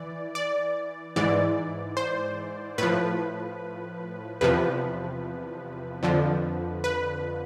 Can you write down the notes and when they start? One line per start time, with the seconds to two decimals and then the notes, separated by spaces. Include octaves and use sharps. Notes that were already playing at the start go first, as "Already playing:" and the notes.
Already playing: E3 D5
0.35 D5
1.16 G#2 E3 D5
1.97 C5
2.78 A2 F3 B4
4.41 E2 C3 F3 B4
6.03 F2 D3 F3
6.84 B4